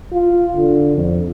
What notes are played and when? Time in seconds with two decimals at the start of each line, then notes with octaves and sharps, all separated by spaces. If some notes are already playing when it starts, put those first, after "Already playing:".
0.13 F4
0.56 D3
0.96 F2